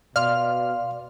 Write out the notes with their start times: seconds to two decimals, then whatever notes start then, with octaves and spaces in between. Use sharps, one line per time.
0.16 B2 D5 F5 C6 F6